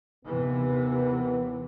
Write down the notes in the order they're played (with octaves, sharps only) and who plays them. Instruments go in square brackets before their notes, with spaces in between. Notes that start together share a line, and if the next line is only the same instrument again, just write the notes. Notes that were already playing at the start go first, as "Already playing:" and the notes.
[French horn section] D#2 B3 [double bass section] C3 E3